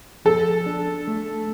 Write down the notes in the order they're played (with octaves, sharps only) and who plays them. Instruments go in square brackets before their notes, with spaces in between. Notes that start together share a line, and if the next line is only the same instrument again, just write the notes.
[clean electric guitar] F3 [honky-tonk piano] A4
[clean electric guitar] D4
A3